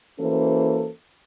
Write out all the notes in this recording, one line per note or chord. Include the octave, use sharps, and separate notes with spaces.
E3 A#3 C#4 F#4 A4 C5